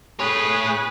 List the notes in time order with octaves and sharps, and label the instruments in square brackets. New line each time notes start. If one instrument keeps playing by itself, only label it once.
[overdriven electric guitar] A3 C#5 [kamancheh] G#4 [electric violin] B4